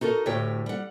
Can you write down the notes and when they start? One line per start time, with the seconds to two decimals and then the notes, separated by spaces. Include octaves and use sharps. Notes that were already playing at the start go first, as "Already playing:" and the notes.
0.01 D#4 F#4 A4 A#4
0.26 D2 A2 G4 C#5 G5
0.66 G3 F#5